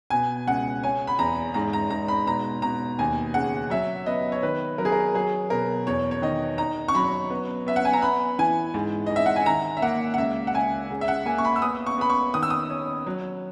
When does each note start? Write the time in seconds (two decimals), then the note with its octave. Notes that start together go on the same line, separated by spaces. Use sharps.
0.10 B2 G#5
0.47 C#2 F#5
0.83 C#4 G#5
1.07 B5
1.19 E2 A#5
1.54 G#2 A#5
1.73 A#5
1.90 G#2 A#5
2.08 B5
2.26 B2 A#5
2.62 B2 A#5
2.99 D#2 G#5
3.34 C#3 F#5
3.70 F#3 E5
4.06 B3 D#5
4.32 C#5
4.43 D#3 B4
4.78 F#3 A#4
4.85 G#4
4.92 A#4
5.14 F#3 G#4
5.50 B2 A#4
5.87 E2 C#5
6.11 C#5
6.22 D#3 D#5
6.58 D#4 A#5
6.88 C#6
6.95 F#3 B5
7.30 B3
7.66 B3 E5
7.76 F#5
7.85 G#5
7.93 A#5
8.02 B3 B5
8.39 E3 G#5
8.74 G#2
9.06 G#2 D#5
9.16 E5
9.26 F#5
9.36 G#5
9.46 D#3 A#5
9.77 E5
9.82 A#3 F#5
10.14 F#5
10.18 C#2 E5
10.47 F#5
10.54 C#2 G#5
10.90 C#3
11.01 E5
11.08 F#5
11.26 A#3 G#5
11.38 C#6
11.45 B5
11.56 E6
11.62 B3 D#6
11.86 C#6
11.98 B3 B5
12.10 C#6
12.34 D#3 D#6
12.43 E6
12.50 D#6
12.70 C#4
13.06 F#3